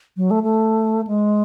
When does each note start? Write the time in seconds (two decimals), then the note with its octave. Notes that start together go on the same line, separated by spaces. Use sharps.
0.17 F#3
0.31 A3
0.44 A3
1.07 G#3